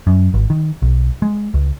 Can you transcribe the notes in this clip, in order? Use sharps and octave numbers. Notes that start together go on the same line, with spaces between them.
F#2
G#1
D#3
B1
G#3
C#2